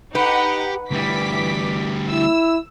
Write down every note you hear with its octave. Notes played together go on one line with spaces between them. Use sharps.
D#4 G4 B4 F#5
D2 E3 G3 D6 B6
E4 E6